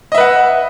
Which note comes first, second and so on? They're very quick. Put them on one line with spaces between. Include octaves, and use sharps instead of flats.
D#5 E5 B4 F#5